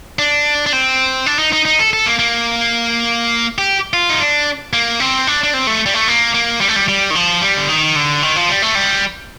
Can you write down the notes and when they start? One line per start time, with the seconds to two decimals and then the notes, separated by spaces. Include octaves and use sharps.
0.19 D4
0.66 D4
0.73 C4
1.26 D4
1.39 D#4
1.53 D#4
1.65 D#4
1.79 A4
1.93 A4
2.06 A#3
2.19 A#3
3.58 G4
3.93 F4
4.09 D#4
4.20 D4
4.73 A#3
5.00 C4
5.27 D4
5.43 D4
5.54 C4
5.67 A3
5.86 G3
5.94 A3
6.08 A#3
6.34 A#3
6.61 G3
6.68 A3
6.76 G3
6.88 G3
7.10 D#3
7.15 F3
7.41 G3
7.57 D3
7.69 D#3
7.96 D3
8.23 D#3
8.36 F3
8.49 G3
8.62 A3
8.75 G3